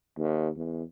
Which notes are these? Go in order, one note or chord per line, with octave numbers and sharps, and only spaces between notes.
D#2
E2